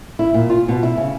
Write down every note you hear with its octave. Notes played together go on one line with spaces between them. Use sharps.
E4
A#2
F4
B2
E4
C#3